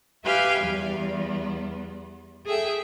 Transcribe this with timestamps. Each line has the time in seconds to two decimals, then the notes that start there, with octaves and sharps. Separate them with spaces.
0.25 G4 B4 E5 F5 G5 G#5
0.61 E2 G3 B3
2.47 G#4 A4 E5 G5